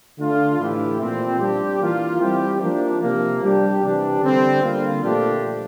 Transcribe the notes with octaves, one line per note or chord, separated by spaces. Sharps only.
D3 A3 D4 F4
A2 E3 A3 E4 G4
A#2 F3 C4
G3 D4 G4
E3 A#3 F4
G3 C4 E4 G4
F3 A#3 D4
C3 F3 A#3
G3 D4 G4
C3 E3 G3 D4 G4
D3 G3 C4
D3 G3 A#3 F4
A#2 F3 A3 D4 G4